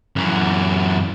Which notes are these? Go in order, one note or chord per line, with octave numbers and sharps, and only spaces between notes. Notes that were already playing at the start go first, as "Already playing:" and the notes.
F#2 E3